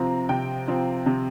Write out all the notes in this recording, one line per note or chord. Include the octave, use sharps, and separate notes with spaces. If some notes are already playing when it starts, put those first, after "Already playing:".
Already playing: C3 F3 C4 A#5
C3 G5
F3 C4
C3